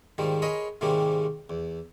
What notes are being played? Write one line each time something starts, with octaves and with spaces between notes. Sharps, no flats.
G#2 D#3 F3 G3
G#4 A#4 C#5 D#5 B5 C6
G#2 C3 D#3 G3 G#3 A#3
E2